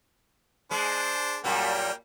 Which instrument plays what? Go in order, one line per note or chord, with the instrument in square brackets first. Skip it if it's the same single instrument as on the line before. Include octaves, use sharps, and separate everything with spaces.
[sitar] G#3 [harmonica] D4 C5
[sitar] F#2 A#2 G3 [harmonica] A#3 G5